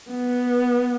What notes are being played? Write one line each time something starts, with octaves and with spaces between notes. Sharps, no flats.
B3